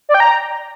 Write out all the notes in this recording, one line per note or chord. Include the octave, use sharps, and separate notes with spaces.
D5
G5
A#5